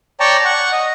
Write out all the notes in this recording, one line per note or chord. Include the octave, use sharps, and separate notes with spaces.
C#5 D5 G5 A5 A#5 C#6
F#5 C#6
D#5